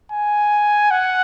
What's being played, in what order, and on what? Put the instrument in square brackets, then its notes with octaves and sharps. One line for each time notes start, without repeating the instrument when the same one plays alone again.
[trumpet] G#5
F#5